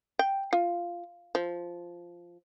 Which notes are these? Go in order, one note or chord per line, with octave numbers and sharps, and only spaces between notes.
G5
F4
F3